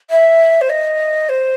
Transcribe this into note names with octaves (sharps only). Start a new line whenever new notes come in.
E5
C5
D#5
C5